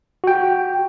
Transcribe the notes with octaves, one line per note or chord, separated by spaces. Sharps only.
F#4 G5